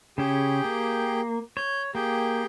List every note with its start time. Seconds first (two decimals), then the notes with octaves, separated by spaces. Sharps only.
0.18 C#3 C#4 G4 G#4 G5
0.64 A#3
1.57 C#5 G6
1.95 A#3 G4 G#4 G5